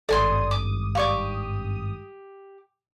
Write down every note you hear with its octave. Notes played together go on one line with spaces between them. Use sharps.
G#1 G2 A4 D5 G#5 C6 D#6
D6
G4 D5 F5 C#6 D6